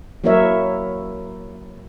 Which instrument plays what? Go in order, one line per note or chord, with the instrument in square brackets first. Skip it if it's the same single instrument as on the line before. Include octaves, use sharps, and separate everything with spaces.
[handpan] F#3 A#3 E4 A#4 C#5 E5